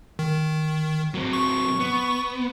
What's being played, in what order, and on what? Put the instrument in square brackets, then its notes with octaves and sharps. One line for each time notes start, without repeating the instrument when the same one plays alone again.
[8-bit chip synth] D#3
[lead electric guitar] F#3 C4
[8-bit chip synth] C#6
[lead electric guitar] B3